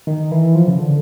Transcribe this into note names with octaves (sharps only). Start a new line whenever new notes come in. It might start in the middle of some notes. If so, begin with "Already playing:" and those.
D#3
E3
F3
C#3
D3